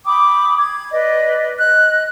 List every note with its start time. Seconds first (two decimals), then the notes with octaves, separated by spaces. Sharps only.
0.06 G5 B5 D6 D#6
0.58 G#6
0.92 B4 D5 D#5
1.58 D#5 F#6